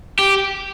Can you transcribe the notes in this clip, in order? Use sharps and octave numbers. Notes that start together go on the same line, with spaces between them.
G4